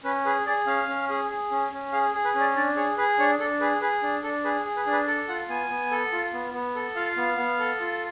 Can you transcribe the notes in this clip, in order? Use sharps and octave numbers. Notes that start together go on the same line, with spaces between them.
C#4 B4
G#4 B4
G#4 D5
C#4 F5
C#4
G#4
G#4
C#4
C#4
G#4 F5
G#4
B4
C#4
D5
D4 D5
G#4 C#5
G#4 B4
D4 C#5
D4 A4
G#4 B4
G#4 B4
D4
D4 A4
G#4 B4
G#4
B4
D4
B4
A4 D5
F4 F#5
B3 G#5
B3
A4
F4
B3
B3
A4
F4 F5
B3
B3
A4
F4